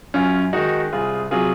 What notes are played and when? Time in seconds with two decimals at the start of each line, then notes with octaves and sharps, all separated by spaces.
0.14 F#2 C#4 F4
0.53 D#3 G#3 D#4 F#4
0.93 C2 F4 G#4
1.31 C3 F#3 F4 G#4